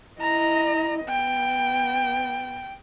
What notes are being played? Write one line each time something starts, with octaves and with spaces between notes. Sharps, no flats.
E4 D#5 A#5
B3 G5